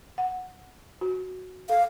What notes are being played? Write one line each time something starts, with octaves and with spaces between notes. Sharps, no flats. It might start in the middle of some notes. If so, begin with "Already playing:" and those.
F#5
F#4
A4 F5